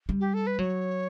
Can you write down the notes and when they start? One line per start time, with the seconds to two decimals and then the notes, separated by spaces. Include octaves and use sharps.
0.09 G3
0.20 G4
0.34 A4
0.47 B4
0.59 F#3 C#5